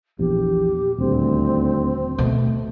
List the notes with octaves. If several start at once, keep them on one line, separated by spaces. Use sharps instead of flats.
A#1 E2 G4
D#1 D2 C4
B2 A3